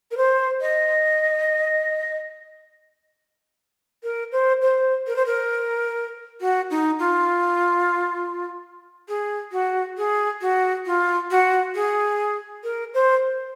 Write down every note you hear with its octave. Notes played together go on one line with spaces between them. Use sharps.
A#4
C5
D#5
A#4
C5
C5
A#4
C5
A#4
F#4
D#4
F4
G#4
F#4
G#4
F#4
F4
F#4
G#4
A#4
C5